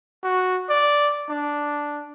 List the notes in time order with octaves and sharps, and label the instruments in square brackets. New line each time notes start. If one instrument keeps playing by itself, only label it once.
[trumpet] F#4
D5
D4